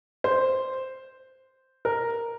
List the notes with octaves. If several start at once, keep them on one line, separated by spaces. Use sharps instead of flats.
C5
A#4